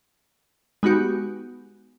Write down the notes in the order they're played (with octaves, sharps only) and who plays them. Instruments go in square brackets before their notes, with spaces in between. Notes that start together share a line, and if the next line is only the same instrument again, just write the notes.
[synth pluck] G#3 B3 D#4 F#4 G4